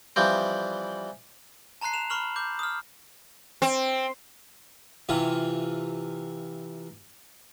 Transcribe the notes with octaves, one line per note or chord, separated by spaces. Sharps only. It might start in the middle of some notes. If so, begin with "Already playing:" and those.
E3 F3 G3 C4
A5 A#5 C6 F#6 C7
E7 F7
B5 C#6 F6 F#7
D6 G6
D#6 F6
C4
C3 E3 F4